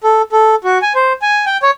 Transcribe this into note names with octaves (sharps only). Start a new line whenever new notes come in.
A4
A4
F#4
G#5
C5
G#5
G5
C#5